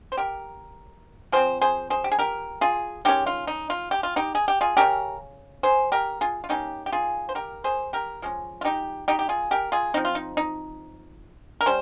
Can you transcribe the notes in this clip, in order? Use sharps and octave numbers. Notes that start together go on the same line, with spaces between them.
C5
G4 A#4
F3 C4 G#4 C5
G#4 C5
G#4 C5
G4
G#4
G4 A#4
F4 G#4
D#3 G#3 C#4 D#4 G4
F4
D#4
F4
G4
F4
D#4 G4
G#4
G4
F4 G#4
C#3 G3 C#4 G4 A#4
G#4 C5
G4 A#4
F4 G#4
F4
D#3 A#3 C#4 D#4 G4
G4
F4 G#4
C5
G4 A#4
G#4 C5
G4 A#4
F3 G#3 C#4
F4
D#4 G4
D#4 G4
G4
F4 G#4
G4 A#4
F4 G#4
F3 C4 D#4
F4
D#4
D#4
A#4
G3 C#4 C5